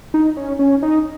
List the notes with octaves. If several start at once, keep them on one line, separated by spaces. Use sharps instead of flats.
D#4
C#4
C#4
D#4